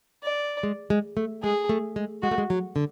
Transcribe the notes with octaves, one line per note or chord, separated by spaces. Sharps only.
D5
G#3
G#3
A3
G#3 G#4
A3
G#3
G#3 F#4
A3
G#3
F#3
D3